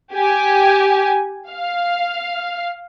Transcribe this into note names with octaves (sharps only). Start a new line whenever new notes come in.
G4 G#5
F5